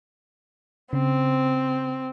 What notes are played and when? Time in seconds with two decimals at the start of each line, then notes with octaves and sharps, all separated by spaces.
0.93 C#3 C4